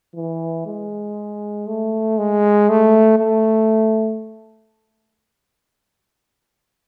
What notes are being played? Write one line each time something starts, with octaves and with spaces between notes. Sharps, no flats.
E3
G#3
A3
G#3
A3
A3